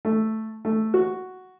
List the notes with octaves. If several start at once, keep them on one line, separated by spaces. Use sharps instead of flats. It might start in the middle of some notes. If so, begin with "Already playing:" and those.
A3
A3
F#4